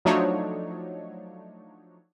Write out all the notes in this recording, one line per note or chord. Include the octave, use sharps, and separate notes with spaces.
F3 F#3 A3 D4 D#4 C#5